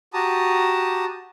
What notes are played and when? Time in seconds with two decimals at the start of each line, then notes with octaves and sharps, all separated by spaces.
0.14 F#4 G4 A5 A#5 D#6